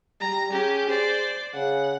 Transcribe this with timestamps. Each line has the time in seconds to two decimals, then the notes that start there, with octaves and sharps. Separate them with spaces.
0.21 G3 A#5
0.52 C#4 G4 G#4
0.89 C5 D5
1.54 C#3 F#5